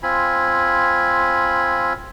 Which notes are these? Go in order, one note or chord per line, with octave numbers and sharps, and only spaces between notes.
C4 F4 G#5 B5